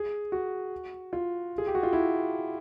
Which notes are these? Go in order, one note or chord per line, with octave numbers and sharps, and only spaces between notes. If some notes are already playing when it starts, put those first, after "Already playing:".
Already playing: G#4
F#4
F4
G#4
G4
F#4
F4
E4